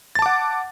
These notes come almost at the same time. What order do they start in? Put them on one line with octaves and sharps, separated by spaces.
A6 A5 D6 F#5